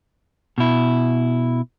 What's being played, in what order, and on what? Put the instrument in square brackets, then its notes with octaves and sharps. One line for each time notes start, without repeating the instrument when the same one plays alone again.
[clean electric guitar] B2 E4